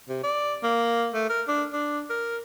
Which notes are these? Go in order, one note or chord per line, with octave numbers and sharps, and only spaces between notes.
C3
D5
A#3
A3
A#4
D4
D4
A#4